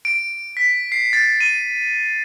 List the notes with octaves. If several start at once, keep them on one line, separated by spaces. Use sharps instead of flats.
D7
B6
C7
A6
D#7